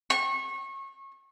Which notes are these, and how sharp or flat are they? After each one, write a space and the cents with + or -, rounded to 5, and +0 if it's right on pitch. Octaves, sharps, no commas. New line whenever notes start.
C#6 -25